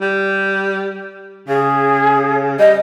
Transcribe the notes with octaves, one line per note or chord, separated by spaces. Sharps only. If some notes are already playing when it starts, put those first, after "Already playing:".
G3
C#3 G#4
G3 D#5